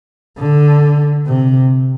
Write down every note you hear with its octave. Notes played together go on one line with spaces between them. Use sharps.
D3
C3